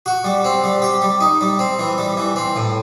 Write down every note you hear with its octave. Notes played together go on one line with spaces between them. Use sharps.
F#4
G3
C4
G3
G4
G3
D#4
G3
C4
E3
G3
E3
C4
A2